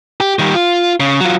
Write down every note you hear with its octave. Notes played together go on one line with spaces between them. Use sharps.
G4
D#3 G3
F4
C#3
F#3 F4